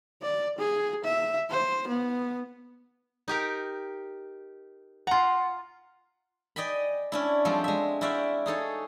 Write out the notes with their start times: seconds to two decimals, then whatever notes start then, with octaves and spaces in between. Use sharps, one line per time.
0.22 D5
0.58 G#4
1.05 E5
1.50 C5
1.88 B3
3.28 D#4 G4 A#4
5.07 F4 F#5 A#5 C6
6.56 D5 D#5 G5 G#5 B5
7.12 C#4 D4 E4
7.45 F3 G3 G#3 C4 A4
7.64 G#3 E5
8.01 E4 F#4 D5 E5 F5 G5
8.46 D#4 G#4 A4 C#5